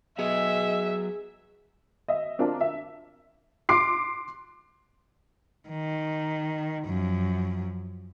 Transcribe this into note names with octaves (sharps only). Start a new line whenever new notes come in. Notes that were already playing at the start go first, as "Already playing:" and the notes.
F#3 B3 G#4 D#5 E5
D#5 E5
C4 D4 F4 A#4 D5 A5
E5
C6 D6 C7
D#3
F#2 F3